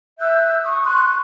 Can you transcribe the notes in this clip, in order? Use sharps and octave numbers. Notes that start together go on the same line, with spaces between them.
E5 E6 F#6 G6
C#6 D#6
C6 C#6 F#6